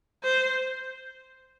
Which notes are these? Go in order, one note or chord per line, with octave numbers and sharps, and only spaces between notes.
C5